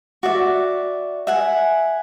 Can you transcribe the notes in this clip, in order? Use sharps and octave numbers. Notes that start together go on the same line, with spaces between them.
F#4 D5 E5
E5 F#5 G#5